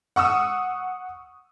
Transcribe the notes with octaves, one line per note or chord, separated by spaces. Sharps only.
F#5 C#6 D#6 E6